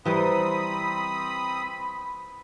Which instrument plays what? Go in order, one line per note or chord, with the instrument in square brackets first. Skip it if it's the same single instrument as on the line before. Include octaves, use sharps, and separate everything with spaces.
[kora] E3 G3 [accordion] C4 D#6 [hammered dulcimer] C5 A#5 [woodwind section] B5